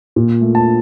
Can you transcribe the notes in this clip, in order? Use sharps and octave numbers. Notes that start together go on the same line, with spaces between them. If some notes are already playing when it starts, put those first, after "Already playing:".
A#2
A3
A5